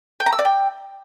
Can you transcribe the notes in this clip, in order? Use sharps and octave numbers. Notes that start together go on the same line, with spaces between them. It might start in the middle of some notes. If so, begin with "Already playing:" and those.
G5
A#5
E6
D5
G5